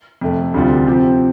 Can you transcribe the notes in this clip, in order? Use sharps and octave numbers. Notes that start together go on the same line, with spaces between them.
F2 C3 A3
D2 C3 G3 C4 F4
C3 F3 C4 G4